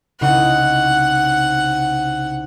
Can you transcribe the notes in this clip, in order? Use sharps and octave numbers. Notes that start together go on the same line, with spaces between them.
C2 C#3 D#4 F#5